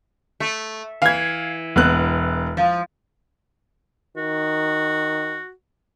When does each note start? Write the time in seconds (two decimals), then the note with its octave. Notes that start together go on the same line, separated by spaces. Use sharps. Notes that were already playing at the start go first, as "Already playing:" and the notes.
0.40 A3
1.02 E3 F5 G#6
1.76 E1 B3 F#6
2.57 F3
4.17 D#3 F#4